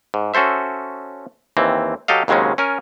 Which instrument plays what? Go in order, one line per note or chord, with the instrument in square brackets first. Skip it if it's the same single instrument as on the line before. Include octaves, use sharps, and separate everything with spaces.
[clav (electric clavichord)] G#2
C#4 F#4 A4 C5 E5
D#2 E3 C4
F#3 G4 A4 D#5 F5
D#2 C#3 F#3 G#3 C4 C#4
C#4 A#4 G#5